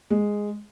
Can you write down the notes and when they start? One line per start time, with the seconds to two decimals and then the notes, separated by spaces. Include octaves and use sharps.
0.10 G#3